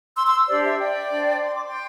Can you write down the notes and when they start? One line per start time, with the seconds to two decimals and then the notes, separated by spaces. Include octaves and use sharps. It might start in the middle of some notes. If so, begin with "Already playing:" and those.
0.16 C6 E6
0.26 C6 E6
0.48 D4 G4 C5 D5
0.64 E5
0.79 D5 G5
1.12 D4 C5
1.44 C6
1.55 D6
1.66 G5 C6